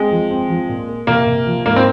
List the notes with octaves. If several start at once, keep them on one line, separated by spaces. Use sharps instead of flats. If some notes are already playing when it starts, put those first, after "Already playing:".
Already playing: G#3 C4
F3
C4
F3
A#2
A#3
C3 A#3
C3
F3
G#2 A#3
C4